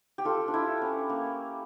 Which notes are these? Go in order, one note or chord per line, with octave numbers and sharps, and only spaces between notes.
G4
F4 A4
D4
E4
C#4
A#3